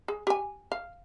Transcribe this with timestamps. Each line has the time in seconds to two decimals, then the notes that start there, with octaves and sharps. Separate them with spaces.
0.08 G#4
0.27 G4 G#5
0.72 F5